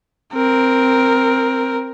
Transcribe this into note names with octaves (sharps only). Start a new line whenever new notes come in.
C4 A#4